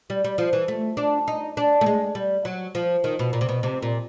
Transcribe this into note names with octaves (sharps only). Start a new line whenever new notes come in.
G3
G3
F3
E3
A3
D4
D#4
D4
A3
G#3
G3
F#3
F3
D#3
B2
A#2
C3
B2
C3
A#2